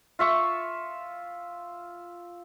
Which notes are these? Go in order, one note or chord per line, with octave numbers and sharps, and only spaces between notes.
F4 E5 C#6